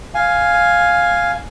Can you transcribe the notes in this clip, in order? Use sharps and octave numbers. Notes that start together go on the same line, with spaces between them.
F5 G#5